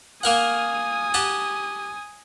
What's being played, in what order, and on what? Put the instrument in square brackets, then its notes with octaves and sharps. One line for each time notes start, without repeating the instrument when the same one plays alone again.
[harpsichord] A#3 A#4 F#5 [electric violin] G#5 D#6
[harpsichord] G4 F#5 A5